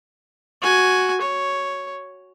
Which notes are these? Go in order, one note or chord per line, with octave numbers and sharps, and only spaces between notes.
F#4 G#5
C#5